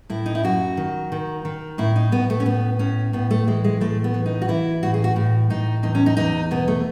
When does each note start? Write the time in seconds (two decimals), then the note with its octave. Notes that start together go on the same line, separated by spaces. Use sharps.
0.10 A2 E4
0.26 D#4
0.35 E4
0.44 F#2 F#4
0.77 D#3
1.12 D#3
1.45 D#3
1.78 A2 E4
1.96 D#4
2.12 A2 B3
2.30 A3
2.40 C#4
2.45 A2 B3
2.79 A2 C#4
3.13 A2 B3
3.31 A3
3.47 E3 G#3
3.64 G#3
3.81 A2 A3
4.04 B3
4.14 E3
4.26 D#4
4.42 F#4
4.48 E3 E4
4.83 A2 F#4
4.94 G#4
5.04 F#4
5.16 A2
5.50 A2 D#4
5.83 E2 D#4
5.95 C#4
6.06 D#4
6.17 E2 D#4
6.51 B2 B3
6.68 A3